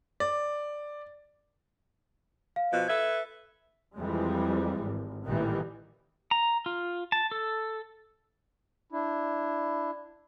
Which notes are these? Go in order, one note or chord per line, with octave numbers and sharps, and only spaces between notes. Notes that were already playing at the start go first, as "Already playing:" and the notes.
D5
F5
B2 F3
A4 B4 E5 G#6
F2 E3 G3 G#3
G#1
A1 A#2 D#3 E3 G3
A#5
F4
A5
A4
D4 E4